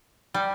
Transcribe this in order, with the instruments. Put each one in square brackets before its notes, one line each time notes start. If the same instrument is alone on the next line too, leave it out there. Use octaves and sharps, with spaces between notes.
[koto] G3